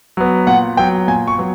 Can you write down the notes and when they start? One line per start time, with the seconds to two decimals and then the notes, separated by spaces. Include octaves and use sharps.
0.17 F#3 B3
0.47 A#2 F#5
0.77 F#3 B3 G5
1.08 A#2 G#5
1.28 C#6
1.38 F#3 B3